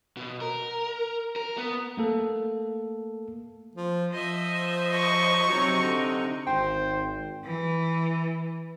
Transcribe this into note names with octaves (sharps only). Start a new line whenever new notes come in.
B2
A#4
A#4
B3
A3 A#3 A4
F3
F3 C5 D#5 E5
C#6
C3 F#3 D#4
D3
G#1 C5 G5
E3